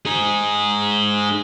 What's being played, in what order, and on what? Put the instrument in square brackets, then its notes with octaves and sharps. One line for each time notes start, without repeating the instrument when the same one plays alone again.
[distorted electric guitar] D#4 G#4